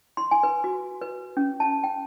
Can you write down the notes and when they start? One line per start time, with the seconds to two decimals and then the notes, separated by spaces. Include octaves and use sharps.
0.17 C6
0.31 G#5
0.43 B4
0.64 F#4
1.02 B4
1.37 C#4
1.60 A5
1.84 G5